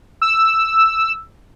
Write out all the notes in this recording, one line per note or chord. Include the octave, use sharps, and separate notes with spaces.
E6